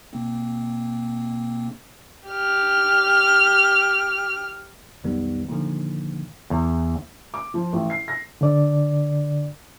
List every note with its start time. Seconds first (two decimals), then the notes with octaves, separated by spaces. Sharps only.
0.13 B2 A#3 C4
2.29 G4 F6
5.04 B1 F2 D#3 G3 B3
5.49 A#2 D3 D#3 F3
6.50 E2
7.34 D6
7.54 F3
7.73 A1
7.90 C7
8.08 A#6
8.41 D3 D5